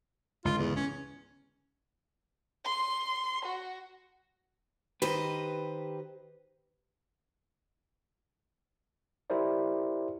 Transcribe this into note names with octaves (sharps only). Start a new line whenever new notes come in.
C#2 G#2 D3 F4
E2
C#4
C6
F#4
D#3 G4 B4 C5 D#5
E4 G4 A#4 C5 D5